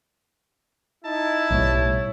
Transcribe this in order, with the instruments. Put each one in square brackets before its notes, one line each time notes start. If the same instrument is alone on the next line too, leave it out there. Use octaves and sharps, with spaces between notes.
[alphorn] D#4 [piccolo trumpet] E4 [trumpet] A5
[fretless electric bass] B1 A2 G3 [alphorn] C#5